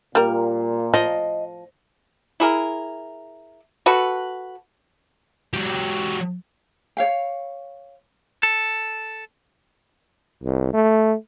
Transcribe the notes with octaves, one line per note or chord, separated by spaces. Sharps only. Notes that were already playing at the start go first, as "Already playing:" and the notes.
A#2 G3 A#4
F3 D#5
E4 G#4 A#4
F#4 A4 B4
F#3 G4
C#5 F5 G5
A4
C2
A3